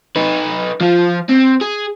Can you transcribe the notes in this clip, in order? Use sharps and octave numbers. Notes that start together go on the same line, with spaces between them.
D#4 B4
F3 F4
C4
G#4